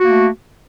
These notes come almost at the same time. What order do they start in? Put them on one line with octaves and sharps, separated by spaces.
F#4 A#3 A3